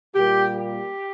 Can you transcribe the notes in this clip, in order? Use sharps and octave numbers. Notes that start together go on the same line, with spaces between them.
A#2 G3 A#3 G4
G4